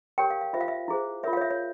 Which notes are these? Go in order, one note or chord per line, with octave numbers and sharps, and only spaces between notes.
G4 A#4 C#5 G5
F5
F5
F4 C5 E5
F5
E5
E4 G#4 C5
F4 A#4 C#5 E5
F5
C#5
E5
C#5